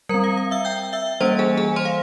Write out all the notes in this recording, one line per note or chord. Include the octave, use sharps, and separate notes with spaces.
G3 C4 A#4 A#5
F5
F5
E5 E6
G5 G6
E5 E6
E3 G3 A#3 C#4 C5 C6
G#4 G#5
G#4 G#5
C5 C6
F5